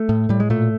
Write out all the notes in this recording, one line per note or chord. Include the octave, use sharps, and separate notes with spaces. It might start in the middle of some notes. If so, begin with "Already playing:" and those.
Already playing: A3
A2
A2 G3
G#3
A#2 A3